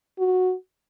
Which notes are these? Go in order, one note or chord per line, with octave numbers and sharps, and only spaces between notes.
F#4